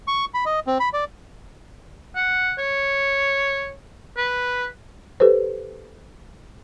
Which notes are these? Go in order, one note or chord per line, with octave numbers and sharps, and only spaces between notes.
C#6
B5
D#5
C4
B5
D5
F#5
C#5
B4
G4 A4 B4 C5